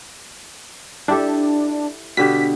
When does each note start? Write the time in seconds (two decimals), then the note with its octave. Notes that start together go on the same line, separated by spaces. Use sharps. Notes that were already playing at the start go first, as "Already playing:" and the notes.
1.08 D4 E4 G4 A4
2.17 B2 D3 G4 B6